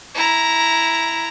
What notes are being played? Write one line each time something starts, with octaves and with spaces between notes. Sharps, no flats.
E4 A#5